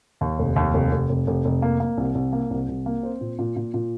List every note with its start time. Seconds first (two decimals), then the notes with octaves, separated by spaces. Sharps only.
0.21 D#2
0.39 F1
0.56 D#2
0.74 F1
0.92 F1
1.09 F1
1.27 F1
1.45 F1
1.62 A#3
1.80 A#3
1.98 C2
2.15 C2
2.33 A#3
2.51 C2
2.69 C2
2.86 A#3
3.03 C4
3.21 A#2
3.39 A#2
3.56 A#2
3.74 A#2